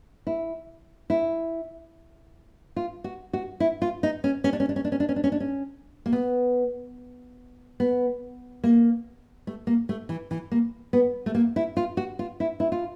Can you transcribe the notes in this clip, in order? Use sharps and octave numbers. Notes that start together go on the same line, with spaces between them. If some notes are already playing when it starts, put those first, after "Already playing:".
E4
E4
F4
F#4
F#4
E4
F4
D#4
C#4
C#4
D4
C#4
D4
C#4
D4
C#4
D4
C#4
D4
C#4
D4
C#4
A#3
B3
B3
A#3
A3
A#3
A3
E3
E3
A#3
B3
A3
A#3
E4
F4
F#4
F4
E4
E4
F4